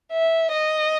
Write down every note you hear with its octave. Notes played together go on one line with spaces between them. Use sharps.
E5
D#5